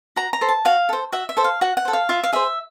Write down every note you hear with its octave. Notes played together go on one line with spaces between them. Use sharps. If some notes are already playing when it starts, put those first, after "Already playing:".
F#4 A#5
A#5
A4 C5
A5
F#4 F5
A4 C5
F#4 E5
E5
A4 C5
F5
F#4 F#5
F#5
A4 C5
F5
F4 E5
F5
G#4 C5 E5